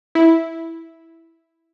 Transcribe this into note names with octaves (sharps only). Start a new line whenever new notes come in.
E4